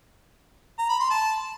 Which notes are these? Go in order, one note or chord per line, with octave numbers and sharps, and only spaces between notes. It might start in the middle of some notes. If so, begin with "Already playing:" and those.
A#5
B5
C6
A5